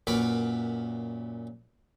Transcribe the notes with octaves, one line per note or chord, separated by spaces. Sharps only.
F#2 A#2 A#4 B4 B5 D6